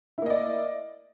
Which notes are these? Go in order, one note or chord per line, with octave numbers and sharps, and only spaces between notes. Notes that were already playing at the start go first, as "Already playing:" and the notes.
A#3 E4 D5 D#5